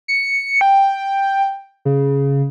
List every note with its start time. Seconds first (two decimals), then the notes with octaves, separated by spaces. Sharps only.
0.08 C#7
0.61 G5
1.85 C#3